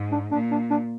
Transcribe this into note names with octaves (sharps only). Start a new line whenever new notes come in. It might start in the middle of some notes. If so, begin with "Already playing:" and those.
Already playing: G#2
D4
A#2 D4
D4
D4